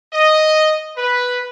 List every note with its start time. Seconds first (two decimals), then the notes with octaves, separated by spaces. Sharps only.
0.13 D#5
0.97 B4